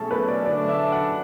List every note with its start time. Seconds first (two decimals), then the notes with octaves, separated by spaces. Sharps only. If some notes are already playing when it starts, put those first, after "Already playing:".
Already playing: B2 F#3 A3 C#4 E4 G#4 A4
0.11 B4
0.28 D5
0.45 D3 F#3 A3 D4 D5
0.69 E5
0.92 F#5